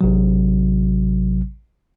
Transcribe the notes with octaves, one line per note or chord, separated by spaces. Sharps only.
A1 C3 F#3